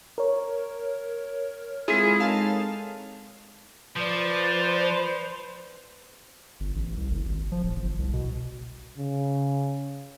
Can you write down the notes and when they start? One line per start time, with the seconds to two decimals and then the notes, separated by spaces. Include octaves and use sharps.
0.18 A#4 C#5
1.88 G#3 C4 E4 F4 G#4 A4
2.20 D#4 F5 A5
3.97 F3 B4 C5 D5
6.60 G1
6.75 A1
6.97 C2
7.11 F#1
7.25 G#1
7.52 F3
7.63 D1
7.76 G1
7.99 C2
8.13 B2
8.97 C#3